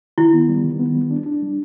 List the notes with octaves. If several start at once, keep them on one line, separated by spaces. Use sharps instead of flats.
D#3 E4
B3
G3
D#3
B3
G3
D4
D4
G3